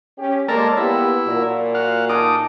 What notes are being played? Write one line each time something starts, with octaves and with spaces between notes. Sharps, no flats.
C#4 G4
G#3 A#3 A4 A#4 C#5 D5 A5 C6
A#3 B3 E4 G4 E5
A#2 F#3 A#5
F#4 F5
D#4 F4 G#4 A4 D6